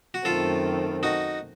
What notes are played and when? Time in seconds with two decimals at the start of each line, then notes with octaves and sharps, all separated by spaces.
0.14 F#4
0.25 F#2 D#3 A3 C4 F4 A4
1.03 D#4 F#4